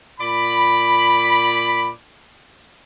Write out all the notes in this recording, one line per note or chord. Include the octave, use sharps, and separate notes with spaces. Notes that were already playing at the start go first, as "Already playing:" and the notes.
A#2 D5 B5